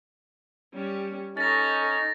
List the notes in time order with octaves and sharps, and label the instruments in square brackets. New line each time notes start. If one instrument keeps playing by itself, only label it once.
[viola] G3 C#4
[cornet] C#4 [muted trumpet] D#4 [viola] A4 [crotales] A6 A#6